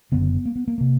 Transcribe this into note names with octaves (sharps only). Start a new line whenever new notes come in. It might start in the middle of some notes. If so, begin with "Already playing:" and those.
F#1 F#2 D3 B3
A#3
B3
A#3
C3 A#3